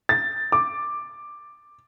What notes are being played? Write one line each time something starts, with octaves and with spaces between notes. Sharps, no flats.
A6
D6